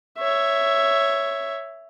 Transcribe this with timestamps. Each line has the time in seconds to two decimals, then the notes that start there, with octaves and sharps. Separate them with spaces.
0.18 C#5 E5